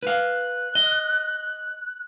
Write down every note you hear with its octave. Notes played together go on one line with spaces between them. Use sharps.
B4 F5 F#6
D#5